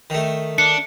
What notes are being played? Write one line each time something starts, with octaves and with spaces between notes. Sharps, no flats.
D#3 A3
D4 C#7